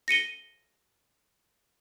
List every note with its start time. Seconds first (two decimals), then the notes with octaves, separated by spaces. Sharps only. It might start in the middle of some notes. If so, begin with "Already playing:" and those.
0.08 A#6 C#7 D#7 G7